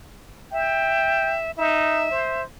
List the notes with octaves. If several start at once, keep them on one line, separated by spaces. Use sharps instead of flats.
E5 G5
D#4 E5
C5